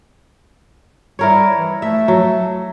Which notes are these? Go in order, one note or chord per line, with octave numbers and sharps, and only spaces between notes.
G3 E4 A#4 C#5
E3
A3 E5
F#3